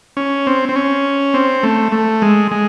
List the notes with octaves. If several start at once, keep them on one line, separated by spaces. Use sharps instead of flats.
C#4
C4
C4
C#4
C4
A3
A3
G#3
G#3